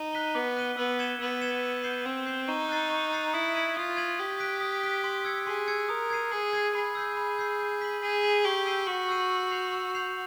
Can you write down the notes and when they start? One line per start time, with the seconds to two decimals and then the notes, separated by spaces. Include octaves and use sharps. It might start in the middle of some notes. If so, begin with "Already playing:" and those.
Already playing: D#4
0.13 F#6 B6 D#7 G7
0.35 B3 D6
0.57 F#6 B6 D#7 G7
0.77 B3 E6
0.99 G#6 C#7 E7 G7
1.20 B3 E6
1.41 G#6 C#7 E7 G7
1.63 E6
1.84 G6 C7 E7 G7
2.05 C4 E6
2.26 G6 C7 E7 G7
2.48 D#4 C#6
2.69 F#6 A6 C7
2.90 C#6
3.12 F#6 A6 C7
3.33 E4 D#6
3.55 G#6 B6 D#7 F#7
3.76 F4 D#6
3.97 G#6 B6 D#7 F#7
4.19 G4 D#6
4.40 F#6 B6 D7
4.61 D#6
4.83 F#6 B6 D7
5.04 C6
5.25 E6 G#6 C#7
5.46 G#4 C6
5.68 E6 G#6 C#7
5.89 A#4 D#6
6.10 G#6 C7 D#7
6.32 G#4 D#6
6.53 G#6 C7 D#7
6.74 G#4 B5
6.95 E6 G6 C7
7.17 B5
7.39 E6 G6 C7
7.60 G6
7.81 B6 D#7 F#7
8.02 G#4 G6
8.23 B6 D#7 F#7
8.45 G4 C#6
8.66 E6 G6 C7 D#7
8.87 F#4 C#6
9.09 E6 G6 C7 D#7
9.30 E6
9.51 G6 C7 F7
9.73 E6
9.95 G6 C7 F7